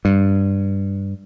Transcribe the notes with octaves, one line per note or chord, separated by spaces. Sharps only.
G2